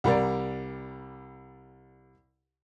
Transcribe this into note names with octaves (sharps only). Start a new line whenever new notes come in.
C2 G3 A#4 D5